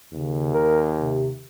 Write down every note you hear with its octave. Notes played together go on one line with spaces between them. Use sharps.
D#2 C#3
A#4
C3